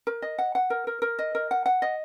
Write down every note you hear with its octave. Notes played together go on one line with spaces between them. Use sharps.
A#4
D#5
F#5
F#5
A#4
A#4
A#4
D#5
A#4
F#5
F#5
D#5